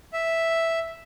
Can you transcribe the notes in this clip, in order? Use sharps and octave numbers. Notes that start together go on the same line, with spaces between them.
E5